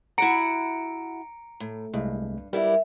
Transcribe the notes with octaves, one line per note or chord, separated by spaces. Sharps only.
E4 F#4 F#5 A#5 C#7 D7
A2
C2 G2 G#3 A3
G3 B3 E4 A#4 D5 E5